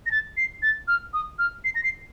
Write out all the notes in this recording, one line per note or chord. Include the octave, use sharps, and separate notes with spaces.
A#6
A6
C7
A6
F6
D#6
F6
C7
A#6
C7